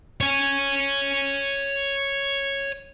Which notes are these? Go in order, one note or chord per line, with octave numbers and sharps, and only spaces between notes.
C#5 G#5